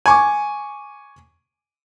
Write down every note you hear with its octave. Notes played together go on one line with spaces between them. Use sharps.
G#5 C#6 D6